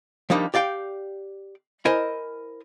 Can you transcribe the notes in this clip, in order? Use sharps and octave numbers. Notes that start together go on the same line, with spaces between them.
F3 G3 A#3 D4 D#4
G4 D5 F5 G5
E4 A#4 C5 D#5 G#5